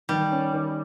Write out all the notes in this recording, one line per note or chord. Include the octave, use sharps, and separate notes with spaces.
D#3 G3
C#4
D#3